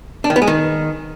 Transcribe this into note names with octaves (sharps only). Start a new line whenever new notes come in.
D4
D#3
B3
G#3
D#3